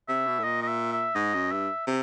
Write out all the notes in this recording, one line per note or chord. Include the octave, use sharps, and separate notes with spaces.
C3 E5
B2
A2
A#2 D#5
D#5
E5
E5
G#2 D#5
F#2
G2 E5
C3 E5